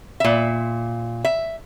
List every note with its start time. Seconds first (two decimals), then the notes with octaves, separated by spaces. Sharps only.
0.20 A#2 E5
1.25 E5